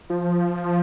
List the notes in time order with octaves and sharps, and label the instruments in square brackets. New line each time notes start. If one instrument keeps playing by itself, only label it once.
[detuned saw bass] F3